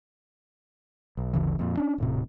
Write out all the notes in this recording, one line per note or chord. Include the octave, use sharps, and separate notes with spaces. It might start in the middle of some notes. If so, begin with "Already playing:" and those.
B1
G1 D2 C#3 E3
F2 A#2
C#4 D4
D#1 A2 C3